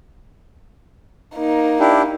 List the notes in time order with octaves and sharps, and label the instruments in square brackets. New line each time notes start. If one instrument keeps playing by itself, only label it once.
[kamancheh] A#3 D#4
[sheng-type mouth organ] D4 E4 G4